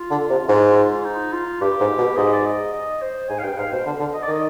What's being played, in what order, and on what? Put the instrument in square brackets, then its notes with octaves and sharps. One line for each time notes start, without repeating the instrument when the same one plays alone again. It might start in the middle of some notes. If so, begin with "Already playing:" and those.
Already playing: [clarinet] F4
[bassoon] D3
C3
[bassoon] G#2 [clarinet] F4
[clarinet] D#4
F4
D#4
F4
[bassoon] G2 [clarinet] G4
[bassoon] G#2
B2
[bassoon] G#2 [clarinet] D#5
[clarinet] D5
D#5
D#5
C5
[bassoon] G#2 [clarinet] G#5
[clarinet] F5
[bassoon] G2 [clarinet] G5
[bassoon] G#2 [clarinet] F5
[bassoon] B2 [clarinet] C5
[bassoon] D3
D3
[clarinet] D#5
D5
[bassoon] D#3 [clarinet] D#5